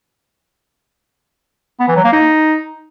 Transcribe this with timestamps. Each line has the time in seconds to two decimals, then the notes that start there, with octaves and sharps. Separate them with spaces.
1.80 B3
1.88 E3
1.96 F#3
2.04 A#3
2.12 D#4